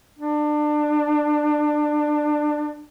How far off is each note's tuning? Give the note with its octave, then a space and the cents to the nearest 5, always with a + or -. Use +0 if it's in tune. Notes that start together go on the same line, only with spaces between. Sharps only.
D4 +25